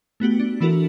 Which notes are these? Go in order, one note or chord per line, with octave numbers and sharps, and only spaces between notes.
A3 B3 F#4 G4
D4
E3 D4 E4 F#4 A4 A#4